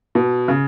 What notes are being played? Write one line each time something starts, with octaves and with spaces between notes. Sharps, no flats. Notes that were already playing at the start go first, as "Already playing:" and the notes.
B2
C#3